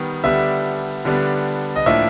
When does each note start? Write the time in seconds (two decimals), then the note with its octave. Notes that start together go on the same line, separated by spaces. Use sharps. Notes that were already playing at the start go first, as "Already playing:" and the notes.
Already playing: D#3 G3 B3
0.24 D3 G3 B3 D4 E5
1.05 D3 G3 B3 D4
1.76 D#5
1.86 A2 F3 A#3 D4 E5